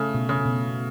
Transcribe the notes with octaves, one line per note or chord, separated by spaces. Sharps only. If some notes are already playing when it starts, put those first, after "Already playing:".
Already playing: C#3 A3
B2
C#3
B2